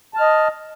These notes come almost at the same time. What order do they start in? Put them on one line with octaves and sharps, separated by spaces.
A5 F6 D#5